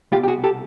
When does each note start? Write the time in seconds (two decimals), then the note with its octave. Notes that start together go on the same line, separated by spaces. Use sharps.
0.12 C2 F4 G4
0.17 B2
0.24 G4
0.28 F#4 G#4
0.44 G4 A4